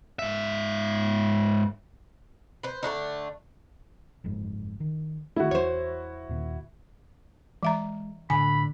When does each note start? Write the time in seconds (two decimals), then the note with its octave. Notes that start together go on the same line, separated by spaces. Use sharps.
0.19 G#2 E5
2.63 B4 C5
2.83 D3 A3 D4 D#4
4.24 F#1 F2 G#2
4.80 D#3
5.36 D#3 A3 E4 F#4
5.51 E2 E3 G3 C5 C#5
6.29 D#2 A#2 D#3
7.63 E3 G#3 E5 A#5
8.30 A2 D3 G#5 B5